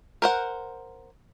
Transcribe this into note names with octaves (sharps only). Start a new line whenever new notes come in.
A#4 C5 F#5